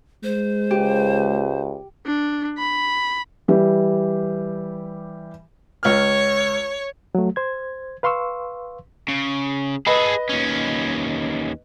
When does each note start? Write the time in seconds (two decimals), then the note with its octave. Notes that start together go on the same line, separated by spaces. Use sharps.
0.24 G#3 C5
0.71 C#2 G4
2.06 D4
2.58 B5
3.48 E3 G3 G4
5.83 C#2 C#5 F6
7.15 F#3 A3
7.36 C5 G#6
8.03 B4 F5 C6 C#6 E6
9.08 C#3
9.87 G#4 A4 B4 D#5 B5
10.29 D#2 C#4